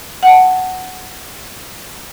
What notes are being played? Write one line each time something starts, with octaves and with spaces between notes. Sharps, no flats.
F#5 A5